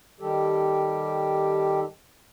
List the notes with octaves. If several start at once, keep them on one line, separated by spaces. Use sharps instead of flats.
D#3 G3 G4 A4